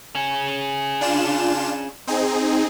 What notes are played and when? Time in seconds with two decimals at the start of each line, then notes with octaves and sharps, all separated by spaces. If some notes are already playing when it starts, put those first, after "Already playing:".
0.15 C#4 G#4
1.01 D4 F4 E7
2.07 C4 D#4 G#4